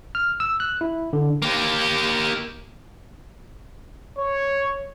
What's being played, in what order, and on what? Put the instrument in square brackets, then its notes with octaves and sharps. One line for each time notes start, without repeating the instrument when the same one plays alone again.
[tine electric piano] F6
E6
F#6
E4
D3
[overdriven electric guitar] A#3 G4
[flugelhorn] C#5